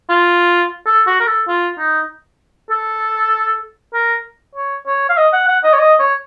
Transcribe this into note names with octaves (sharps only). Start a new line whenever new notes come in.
F4
A4
F#4
A#4
A4
F4
D#4
A4
A#4
C#5
C#5
F5
D#5
F#5
F#5
D#5
C#5
D#5
C#5